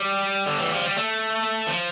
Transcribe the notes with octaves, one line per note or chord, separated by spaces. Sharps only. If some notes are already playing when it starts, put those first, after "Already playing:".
Already playing: G3
D3
E3
F3
G3
A3
F3